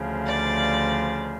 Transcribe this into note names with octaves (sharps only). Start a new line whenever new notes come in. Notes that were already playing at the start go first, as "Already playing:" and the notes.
Already playing: D2 C#3 F3
D5